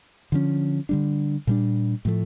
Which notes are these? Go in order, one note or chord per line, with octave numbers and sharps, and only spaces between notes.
D3 F3 C#4
D3 G3 D4
A#2 G3 D4
A2 F3 A3